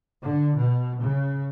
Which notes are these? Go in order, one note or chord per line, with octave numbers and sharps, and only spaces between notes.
D3
B2
C#3